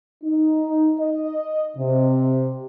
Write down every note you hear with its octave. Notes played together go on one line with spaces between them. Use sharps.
D#4
D#5
C3